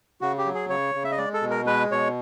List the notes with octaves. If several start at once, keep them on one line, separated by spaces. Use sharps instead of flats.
C#3 F#4
G4
F#3
G#4
C#3 C#5
C#3
E5
D#5
G#3 D5
A4
B2
A#4
G#3 B4
B2 C#5